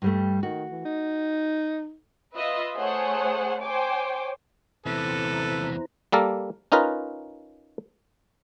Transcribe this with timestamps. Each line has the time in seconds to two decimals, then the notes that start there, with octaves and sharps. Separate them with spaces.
0.02 G2 G3 A3
0.43 D#3 F#4
0.71 E3
0.85 D#4
2.36 F4 B4 D#5 E5
2.76 A3 G#4 C5 C#5 F#5
3.63 C5 C#5 G5 G#5 D6
4.86 E2 C3 E4 A4 B4 C5 A#5
6.12 G3 A#3 A4 A#4
6.72 C#4 D#4 F4 A#4 B4